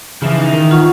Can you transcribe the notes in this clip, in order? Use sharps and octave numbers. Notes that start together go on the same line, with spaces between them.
C#3 E3 F3 E4 E5
D#4
D#3
F4 F#5 C#6